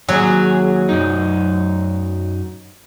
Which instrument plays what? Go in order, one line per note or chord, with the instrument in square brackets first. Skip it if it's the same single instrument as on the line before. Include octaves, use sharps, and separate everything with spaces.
[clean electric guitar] D#2 G#4 [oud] F#3
[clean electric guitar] F#2 D#4